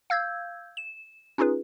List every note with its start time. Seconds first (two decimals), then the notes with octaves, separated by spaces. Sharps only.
0.10 F5 E6 G6 G#6
0.77 E7
1.38 C#4 D#4 F4 G#4 B4